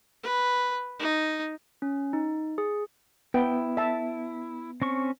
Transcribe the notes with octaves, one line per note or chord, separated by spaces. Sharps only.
B4
D#4
C#4
D#4
G#4
B3 E4 G5
E5 A5
C4 C#4 C#6